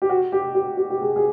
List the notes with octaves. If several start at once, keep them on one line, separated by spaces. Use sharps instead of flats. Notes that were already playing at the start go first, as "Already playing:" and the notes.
G4
F#4
G4
G4
G4
G4
G#4
G#4